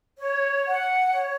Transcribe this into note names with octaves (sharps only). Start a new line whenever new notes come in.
C#5
F#5
C#5